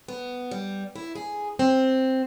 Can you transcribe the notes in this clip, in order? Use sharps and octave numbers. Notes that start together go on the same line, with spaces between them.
B3
G3
E4
G#4
C4